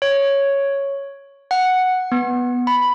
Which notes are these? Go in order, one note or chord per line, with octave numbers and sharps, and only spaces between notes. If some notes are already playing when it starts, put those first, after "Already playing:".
C#5
F#5
B3
B5